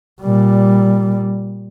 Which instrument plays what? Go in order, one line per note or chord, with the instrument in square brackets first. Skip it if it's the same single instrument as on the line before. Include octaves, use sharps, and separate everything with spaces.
[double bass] A#2 G3